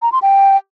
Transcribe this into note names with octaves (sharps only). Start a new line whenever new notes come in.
A#5
C6
G5